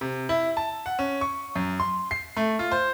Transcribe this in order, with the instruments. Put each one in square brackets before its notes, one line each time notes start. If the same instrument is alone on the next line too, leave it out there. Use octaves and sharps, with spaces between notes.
[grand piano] C3
E4
A5
F#5
C#4
C#6
F#2
C6
C7
A3
F4
C5